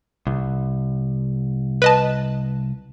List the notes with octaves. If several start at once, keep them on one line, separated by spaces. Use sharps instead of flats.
C2
B4 D#5 A5